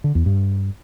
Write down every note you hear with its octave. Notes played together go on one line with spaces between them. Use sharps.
D3
E2
G2